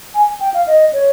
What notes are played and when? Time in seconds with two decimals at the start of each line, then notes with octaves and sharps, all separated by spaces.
0.15 G#5
0.41 G5
0.54 F5
0.67 D#5
0.93 C#5